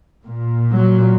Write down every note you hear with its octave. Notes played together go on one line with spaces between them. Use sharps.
A#2
F#3